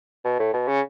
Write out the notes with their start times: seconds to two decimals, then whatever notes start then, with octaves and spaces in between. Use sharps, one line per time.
0.25 B2
0.40 A2
0.54 B2
0.68 C#3